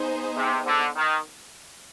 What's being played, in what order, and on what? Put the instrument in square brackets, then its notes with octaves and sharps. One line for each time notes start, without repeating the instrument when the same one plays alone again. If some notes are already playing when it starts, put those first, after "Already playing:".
Already playing: [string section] B3 D#4 G#4 C5
[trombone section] C3
D3
D#3